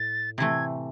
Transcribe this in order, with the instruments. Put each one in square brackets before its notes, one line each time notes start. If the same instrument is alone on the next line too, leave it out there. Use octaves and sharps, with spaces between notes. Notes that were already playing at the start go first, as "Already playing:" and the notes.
Already playing: [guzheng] A2 [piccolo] A6
[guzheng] C3 E3 A3 [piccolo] G#6